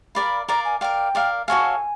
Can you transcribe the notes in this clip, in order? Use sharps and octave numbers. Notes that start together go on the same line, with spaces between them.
A#4 D5 F5 B5
A#4 D5 F5 A#5
G#5
A#4 D5 F5 G5
A#4 D5 F5
F#4 A4 C#5 F5 G#5